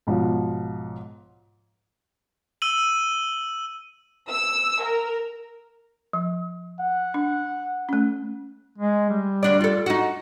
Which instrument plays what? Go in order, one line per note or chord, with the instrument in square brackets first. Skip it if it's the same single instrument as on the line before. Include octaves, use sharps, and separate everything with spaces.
[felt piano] B1 G#2 F3
[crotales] E6 D#7 F#7
[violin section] E6
A#4
[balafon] F3
[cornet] F#5
[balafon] D4
A3 C#4
[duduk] G#3
G3
[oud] D2 D4 D5
F4 A4
D#4 F#4